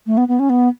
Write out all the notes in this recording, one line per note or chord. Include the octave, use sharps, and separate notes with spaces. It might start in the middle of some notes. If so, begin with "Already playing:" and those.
A3
B3
B3
C#4
B3